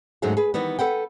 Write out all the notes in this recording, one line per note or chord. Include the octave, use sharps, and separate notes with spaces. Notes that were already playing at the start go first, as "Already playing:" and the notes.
D#2 G#2 F#3 A3 C#4 G#4
G#4 B4
D#3 E3 G3 B3
A4 B4 F#5 G5